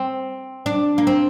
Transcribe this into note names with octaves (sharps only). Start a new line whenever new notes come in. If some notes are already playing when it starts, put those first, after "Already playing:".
Already playing: C4
D4
A#3
C4